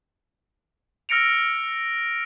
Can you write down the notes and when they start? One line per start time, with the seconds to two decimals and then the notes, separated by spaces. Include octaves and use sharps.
1.09 E6 F6 A#6 C#7 D7 F7